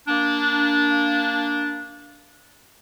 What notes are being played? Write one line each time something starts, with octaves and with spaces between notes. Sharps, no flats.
A#3 D4